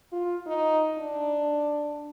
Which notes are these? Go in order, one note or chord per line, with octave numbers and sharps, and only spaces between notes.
F4
D#4
D4